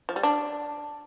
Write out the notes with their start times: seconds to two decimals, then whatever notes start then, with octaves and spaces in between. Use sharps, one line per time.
0.09 F3
0.16 G3
0.23 D4